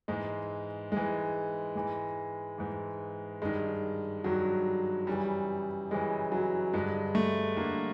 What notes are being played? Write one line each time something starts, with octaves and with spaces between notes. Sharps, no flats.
G#2 E3 G#3
G#2 E3 G#3
G#2 E3
G#2 E3
G2 D#3 G#3
G2 D#3 F#3
F#2 C#3 E3 G3
F#2 C#3 E3 G#3
F#3
G2 D3 G#3
A3
G2 D3 A#3